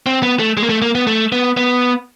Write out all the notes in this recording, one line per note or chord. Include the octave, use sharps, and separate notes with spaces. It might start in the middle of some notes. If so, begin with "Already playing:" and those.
C4
B3
A3
G#3
A#3
A3
A#3
B3
A3
B3
B3